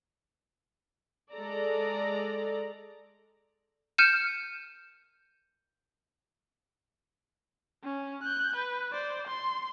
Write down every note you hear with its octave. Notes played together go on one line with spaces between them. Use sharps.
G#3 A4 D5 A#5
F6 G6 C#7 D#7 E7
C#4
F#6 G6
B4
C5 D5
C6